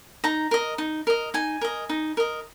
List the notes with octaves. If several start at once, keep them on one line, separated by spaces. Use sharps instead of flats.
D#4 A#5
A#4 D#5
D#4
A#4 D#5
D#4 G#5
A#4 D#5
D#4
A#4 D#5